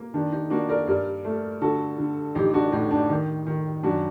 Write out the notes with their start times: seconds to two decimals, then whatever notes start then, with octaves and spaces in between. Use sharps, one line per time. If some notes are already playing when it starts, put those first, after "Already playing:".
Already playing: A#3
0.14 D#3 D4
0.32 D#4
0.50 A#3 D4 F#4
0.69 A#4 D5
0.87 G2 A#4 D5
1.25 A3
1.61 D3 F#4 A4
1.99 D3
2.35 A1 D#4 G4
2.54 D4 F#4
2.72 A2 D#4
2.91 D4
3.09 D#3 D#4
3.47 D#3
3.83 F#2 D4 F#4